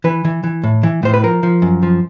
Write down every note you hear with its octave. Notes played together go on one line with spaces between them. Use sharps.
E3 B4
E3
E3
A2
E3
A2 C5
B4
F3 A#4
F3
F#2
F3